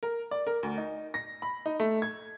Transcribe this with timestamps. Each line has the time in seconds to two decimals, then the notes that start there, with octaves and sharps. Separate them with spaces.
0.03 A#4
0.31 D5
0.47 A#4
0.63 D2
0.78 D#4
1.14 A#6
1.42 B5
1.66 D#4
1.80 A3
2.02 G#6